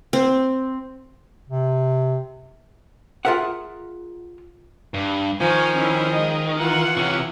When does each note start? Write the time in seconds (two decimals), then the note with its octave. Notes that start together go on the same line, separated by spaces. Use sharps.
0.13 C4
1.49 C3
3.25 F4 G#4 A#4 E5 F#5
4.94 G2
5.41 D#3 F3 G#5 C#6
5.75 C#4 E4
6.09 G#3 D#5
6.59 E3 F4 F#5
6.97 C3 C#4